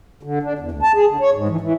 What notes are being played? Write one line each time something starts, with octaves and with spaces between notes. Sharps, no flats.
D3
D4
E2
D2
A5
G#4
D3
C#5
G#2
E3
E3